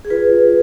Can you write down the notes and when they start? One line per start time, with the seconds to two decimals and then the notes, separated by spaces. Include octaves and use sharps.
0.05 G#4
0.10 F4 B4